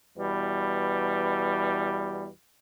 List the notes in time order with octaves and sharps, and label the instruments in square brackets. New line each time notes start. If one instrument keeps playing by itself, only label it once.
[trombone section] E2 B2 G3